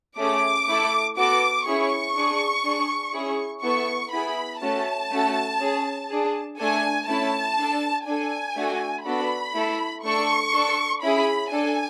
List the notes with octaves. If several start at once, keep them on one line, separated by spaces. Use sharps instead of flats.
A3 C#4 G#4 D6
A3 E4 A4
B3 F#4 A4 D6
C#4 E4 G#4 C#6
D4 G#4
D4 G#4
C#4 E4 G#4
B3 E4 A4 C#6
B3 E4 G#4 B5
A3 C#4 F#4 A5
A3 C#4 F#4 A4
C#4 G#4
D4 G#4
A3 D4 A4 G#5
A3 C#4 E4 A5
D4 A4
D4 A4 G#5
A3 D4 F#4 A4
B3 D4 F#4 A4 B5
A3 E4 A4
A3 D4 A4 C#6
D4 A4
C#4 E4 G#4 B5
D4 A4 G#5